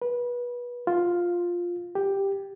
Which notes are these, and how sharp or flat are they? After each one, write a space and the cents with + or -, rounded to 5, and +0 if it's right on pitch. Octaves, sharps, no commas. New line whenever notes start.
B4 -25
F4 +5
G4 +5